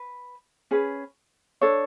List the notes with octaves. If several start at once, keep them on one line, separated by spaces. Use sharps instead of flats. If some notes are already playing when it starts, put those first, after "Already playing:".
Already playing: B4
C#4 G#4 B4
D4 A4 C#5